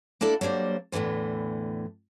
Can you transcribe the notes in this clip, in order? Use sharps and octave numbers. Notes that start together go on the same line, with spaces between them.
A#3 D4 E4 A4 D5
F#3 G3 A#3 D4 C5
E2 A2 D3 E3 F3